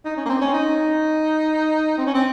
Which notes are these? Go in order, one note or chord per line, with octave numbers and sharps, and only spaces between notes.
D#4
C#4
A#3
C4
C#4
D#4
C4
C#4
C4